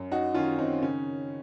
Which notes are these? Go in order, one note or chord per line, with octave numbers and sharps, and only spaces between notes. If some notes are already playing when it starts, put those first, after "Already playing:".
Already playing: F#2
D#4 F#4
D#3 C#4 F4
C4 D#4
C#3 C#4